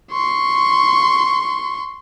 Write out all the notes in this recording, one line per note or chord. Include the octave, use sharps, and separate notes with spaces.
C6 C#6